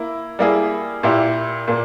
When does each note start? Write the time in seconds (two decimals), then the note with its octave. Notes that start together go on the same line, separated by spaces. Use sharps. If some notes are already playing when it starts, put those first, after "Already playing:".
Already playing: A#3 E4
0.39 G3 A#3 E4 G#4
1.03 A#2 A#3 E4 G4
1.68 A#2 A#3